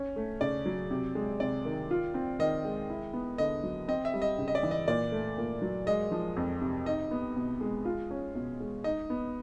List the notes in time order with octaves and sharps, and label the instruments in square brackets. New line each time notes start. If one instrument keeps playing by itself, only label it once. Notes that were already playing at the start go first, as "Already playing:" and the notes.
Already playing: [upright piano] C#4
A3
[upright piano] C#3 [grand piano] D5
[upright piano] F#3
C3
G#3
[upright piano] C3 [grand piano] D5
[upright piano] D#3
F4
C4
[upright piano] D#3 [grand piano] D#5
[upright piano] G#3
E4
B3
[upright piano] D3 [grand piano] D#5
[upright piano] F#3
[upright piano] C4 [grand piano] D#5
[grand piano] E5
[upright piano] G3
[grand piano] D#5
[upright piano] C#3
[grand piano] D#5
D5
[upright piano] E3
[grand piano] D#5
[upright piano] A#2 [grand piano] D5
[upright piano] A3
A#2
F#3
[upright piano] G#3 [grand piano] D#5
[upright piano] F3
F2
C3
[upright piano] D#4 [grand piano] D#5
[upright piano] B3
B2
G#3
F4
C#4
B2
G#3
[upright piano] D#4 [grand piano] D#5
[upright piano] B3